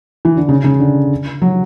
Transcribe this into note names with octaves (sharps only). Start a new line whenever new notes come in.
E3
D3
C#3
C#3
D3
F#3